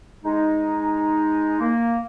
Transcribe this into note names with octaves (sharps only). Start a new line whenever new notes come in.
G#3 D#4
A#3